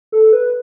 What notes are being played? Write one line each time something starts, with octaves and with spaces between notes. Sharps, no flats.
A4
B4